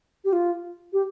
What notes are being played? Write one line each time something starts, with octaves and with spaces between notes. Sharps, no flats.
G4
F4
G4